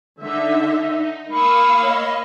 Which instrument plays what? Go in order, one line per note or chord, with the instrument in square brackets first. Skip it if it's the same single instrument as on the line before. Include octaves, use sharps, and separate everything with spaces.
[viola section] D3 E5 [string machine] D#4
[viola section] A#3 F5 [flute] B5 [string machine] C#6 D#6 E6
[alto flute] C#5 [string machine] D#5